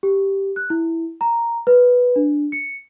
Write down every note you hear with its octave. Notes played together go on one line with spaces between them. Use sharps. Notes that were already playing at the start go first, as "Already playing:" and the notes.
G4
F#6
E4
A#5
B4
D4
C#7